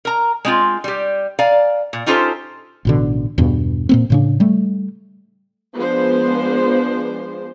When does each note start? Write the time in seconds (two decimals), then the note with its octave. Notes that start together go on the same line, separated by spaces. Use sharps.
0.05 A#4 A#5
0.45 G#3 C4 F4
0.84 G3 G4
1.39 D5 F5 G#5 A#5
1.93 A#2
2.06 C#4 D#4 F4 G4 A4 C5
2.85 A1 B2 D3
3.38 E2 G2 B2
3.89 A#2 A#3 C4
4.10 A2 C#3 D4
4.40 G3 A3
5.73 F3 G#3 B3 D4 C5